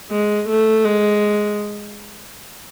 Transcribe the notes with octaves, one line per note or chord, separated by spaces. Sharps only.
G#3
A3
G#3